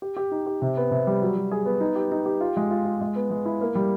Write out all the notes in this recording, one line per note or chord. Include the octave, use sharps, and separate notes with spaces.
G4
G4
D#4
G4
C3
B3
C3
G3
F#3
F#3
G#4
B3
D#4
G4
D#4
G4
F4
G#3
F4
F4
G#3
B3
G#3
E4
A#3
G3